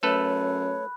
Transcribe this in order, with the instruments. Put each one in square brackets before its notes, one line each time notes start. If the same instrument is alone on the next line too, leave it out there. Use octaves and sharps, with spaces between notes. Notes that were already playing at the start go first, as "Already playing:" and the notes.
[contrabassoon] F#2 [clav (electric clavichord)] A3 A4 B4 [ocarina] C#5 [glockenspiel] B5 F#6